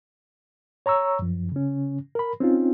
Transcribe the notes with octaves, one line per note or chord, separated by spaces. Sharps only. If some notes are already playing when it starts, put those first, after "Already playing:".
C#5 A#5 C#6 E6
F#2 F3
C#3 C#4
A#4 B5
C4 C#4 D#4 F4